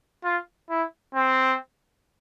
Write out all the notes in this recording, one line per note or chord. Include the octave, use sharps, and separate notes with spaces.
F4
E4
C4